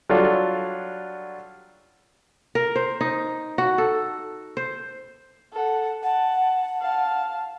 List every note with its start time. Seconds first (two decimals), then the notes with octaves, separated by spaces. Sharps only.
0.09 F#3 G3 D4 F4 F#4 A4
2.55 A#4
2.76 C5
3.01 D#4
3.58 F#4
3.78 A4
4.57 C5
5.53 A4 F#5
6.03 F#5 A5
6.81 F5 A5